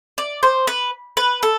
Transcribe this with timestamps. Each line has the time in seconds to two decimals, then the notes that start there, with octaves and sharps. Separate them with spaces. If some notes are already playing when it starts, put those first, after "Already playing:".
0.18 D5
0.43 C5
0.67 B4
1.17 B4
1.43 A4